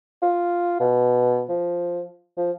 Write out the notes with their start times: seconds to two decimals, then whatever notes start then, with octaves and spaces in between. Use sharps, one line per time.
0.23 F4
0.80 B2
1.49 F3
2.37 F3